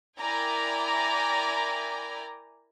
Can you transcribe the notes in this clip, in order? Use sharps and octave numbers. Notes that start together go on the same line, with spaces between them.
E4 A#4 D5 G5 G#5 A#5